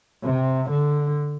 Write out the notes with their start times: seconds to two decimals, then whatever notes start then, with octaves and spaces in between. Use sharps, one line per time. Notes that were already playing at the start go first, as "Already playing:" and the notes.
0.24 C3
0.71 D3